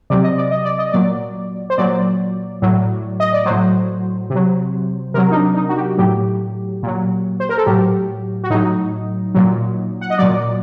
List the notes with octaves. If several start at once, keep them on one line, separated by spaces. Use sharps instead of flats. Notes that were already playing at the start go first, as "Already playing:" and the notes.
C3 F#3 D5
D#5
D5
D#5
D5
D#5
A#2 F#3 D5
C5
A#2 F#3 D5
A2 F#3
D#5
D5
A2 F#3 C5
C3
F#3
C3 F#3 A#4
D#4
D4
D#4
F#4
G4
A2 F#3 G4
A#2 F#3
C5
A#4
A4
A2 F#3 G4
F#4
A2 F#3 D#4
A#2 F#3
F#5
D#5
A#2 F#3 D5